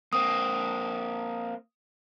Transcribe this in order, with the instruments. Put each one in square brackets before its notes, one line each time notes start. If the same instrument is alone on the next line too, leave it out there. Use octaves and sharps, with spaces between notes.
[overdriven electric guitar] A#3 C4 [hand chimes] D#6